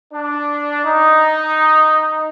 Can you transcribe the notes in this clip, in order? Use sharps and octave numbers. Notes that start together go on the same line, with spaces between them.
D4
D#4